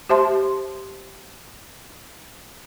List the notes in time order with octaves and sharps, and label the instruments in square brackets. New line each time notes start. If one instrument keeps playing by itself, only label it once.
[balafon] G4 C5 E5 A5 C6